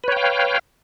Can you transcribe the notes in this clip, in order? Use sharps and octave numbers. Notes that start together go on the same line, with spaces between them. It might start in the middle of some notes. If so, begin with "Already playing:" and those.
B4 C#5 F5 G5